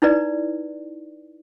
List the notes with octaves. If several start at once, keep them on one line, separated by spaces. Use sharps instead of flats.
D#4 E4 B4 D5